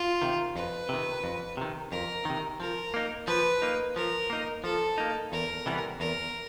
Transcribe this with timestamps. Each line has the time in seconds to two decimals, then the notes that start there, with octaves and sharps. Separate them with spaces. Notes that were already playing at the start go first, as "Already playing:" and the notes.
Already playing: F4
0.22 C3 D#3
0.56 F2 B4
0.89 C3 D#3
1.24 F2
1.57 C3 D#3
1.91 F2 A#4
2.25 C3 D#3
2.60 F3 A#4
2.94 A#3 D#4
3.28 F3 B4
3.62 A#3 D#4
3.96 F3 A#4
4.30 A#3 D#4
4.64 F3 A4
4.98 A#3 D#4
5.32 E2 A#4
5.66 C3 E3 G3 B3
6.00 E2 A#4